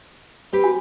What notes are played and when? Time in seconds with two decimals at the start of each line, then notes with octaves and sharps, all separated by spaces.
0.53 C4 G4 B4
0.64 F#4 G#5